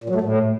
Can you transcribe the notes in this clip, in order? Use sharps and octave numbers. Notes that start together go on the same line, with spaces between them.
A#2
F#3
A3
A2